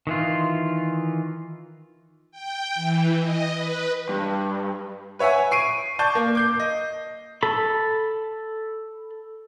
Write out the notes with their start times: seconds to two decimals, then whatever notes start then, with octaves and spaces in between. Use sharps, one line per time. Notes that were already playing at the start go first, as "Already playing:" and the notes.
0.07 D#3 E3 F4
2.32 G5
2.75 E3
3.20 D#5
3.53 B4
4.09 G2
5.19 B4 C#5 E5 F#5 G#5
5.51 C#6 C7 D7 D#7
5.99 D5 A5 C#6 G6
6.15 A#3
6.35 D6 G6 C7
6.60 D#5
7.43 A4 B5